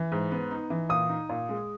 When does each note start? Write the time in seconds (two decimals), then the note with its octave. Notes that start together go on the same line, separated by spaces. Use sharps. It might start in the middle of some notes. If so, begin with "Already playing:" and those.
Already playing: E3
0.12 G#2
0.31 B3
0.51 D#4
0.70 E3
0.89 A#2 D#6
1.09 D#4
1.29 A#2
1.49 G#3